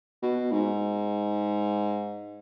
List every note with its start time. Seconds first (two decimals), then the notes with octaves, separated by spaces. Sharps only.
0.22 B2
0.52 G#2